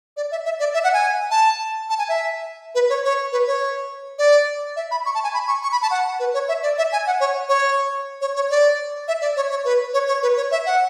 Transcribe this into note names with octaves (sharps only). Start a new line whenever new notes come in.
D5
E5
E5
D5
E5
F#5
G#5
A5
A5
G#5
E5
B4
C#5
C#5
B4
C#5
D5
E5
B5
C#6
A5
G#5
B5
C#6
C#6
B5
A5
F#5
B4
C#5
E5
D5
E5
G#5
F#5
C#5
C#5
C#5
C#5
D5
E5
D5
C#5
C#5
B4
C#5
C#5
B4
C#5
E5
F#5